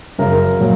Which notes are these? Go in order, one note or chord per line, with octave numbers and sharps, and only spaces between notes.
F#2 C#3 F#3 A#4
A#2 F#3